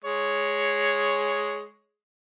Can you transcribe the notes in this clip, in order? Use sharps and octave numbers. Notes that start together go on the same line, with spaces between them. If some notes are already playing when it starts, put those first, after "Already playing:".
G#3 C#5